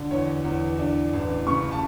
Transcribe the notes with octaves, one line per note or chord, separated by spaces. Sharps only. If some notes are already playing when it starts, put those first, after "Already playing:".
Already playing: D3
E2 C#5
E2
D4
A1
C#3 C#6
A5